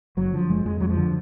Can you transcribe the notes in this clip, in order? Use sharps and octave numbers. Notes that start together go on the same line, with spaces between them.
F#1 F#3
D3 F3
F#1 G#3
F2 G#3
F2 F#3
F3
D3